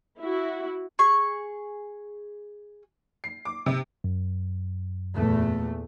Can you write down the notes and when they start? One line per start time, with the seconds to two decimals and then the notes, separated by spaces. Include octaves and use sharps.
0.20 E4 F#4
0.99 G#4 C#6
3.24 C7
3.45 D6
3.66 C3
4.04 F#2
5.15 E2 A#2 A3